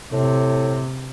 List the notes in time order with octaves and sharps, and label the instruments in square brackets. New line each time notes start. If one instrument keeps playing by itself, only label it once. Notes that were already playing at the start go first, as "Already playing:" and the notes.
[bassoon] A2 [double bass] C3